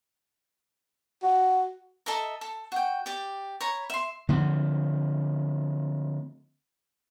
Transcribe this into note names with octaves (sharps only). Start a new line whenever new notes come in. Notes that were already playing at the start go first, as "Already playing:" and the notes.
F#4
A4 D#5 E5 A#5
A4
F#4 G5
G4 D5
C#5 A#5 B5
E5 C6
D3 F3 A3 C4